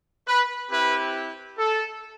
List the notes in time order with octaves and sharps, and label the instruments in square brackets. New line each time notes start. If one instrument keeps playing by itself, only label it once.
[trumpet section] B4
C4 E4 G4 B4
A4